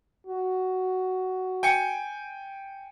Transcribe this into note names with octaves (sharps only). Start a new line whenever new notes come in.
F#4
G5 G#5 C#7